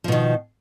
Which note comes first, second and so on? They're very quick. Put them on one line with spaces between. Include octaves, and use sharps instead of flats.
F3 B2 D#3